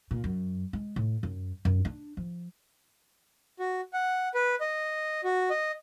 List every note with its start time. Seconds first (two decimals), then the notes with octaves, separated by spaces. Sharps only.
0.11 A#2
0.24 F#2
0.73 G#3
0.96 A2
1.23 F#2
1.65 F#2
1.85 D4
2.17 F3
3.59 F#4
3.93 F#5
4.34 B4
4.60 D#5
5.24 F#4
5.50 D#5